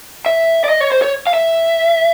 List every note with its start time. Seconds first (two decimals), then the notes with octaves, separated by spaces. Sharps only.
0.26 E5
0.64 D5
0.69 D#5
0.81 C#5
0.92 C5
1.02 C#5
1.27 F5
1.34 E5